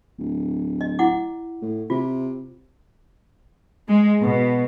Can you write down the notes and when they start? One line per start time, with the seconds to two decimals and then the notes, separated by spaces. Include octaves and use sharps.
0.19 D1
0.81 D#5
0.99 E4 F#5 D6
1.62 A2
1.90 C3 F4
3.88 G#3
4.21 B2